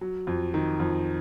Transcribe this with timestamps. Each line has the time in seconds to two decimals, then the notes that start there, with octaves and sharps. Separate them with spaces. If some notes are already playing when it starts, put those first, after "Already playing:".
0.01 F#3
0.27 F2
0.54 D#3
0.80 F2